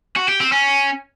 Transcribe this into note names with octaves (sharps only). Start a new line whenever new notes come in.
F#4
G4
C4
C#4